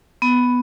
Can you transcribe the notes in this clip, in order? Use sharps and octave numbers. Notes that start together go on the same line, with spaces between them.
B3